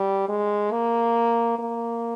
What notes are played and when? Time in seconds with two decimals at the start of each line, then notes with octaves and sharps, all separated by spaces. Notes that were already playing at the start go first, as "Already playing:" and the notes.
Already playing: G3
0.29 G#3
0.72 A#3
1.59 A#3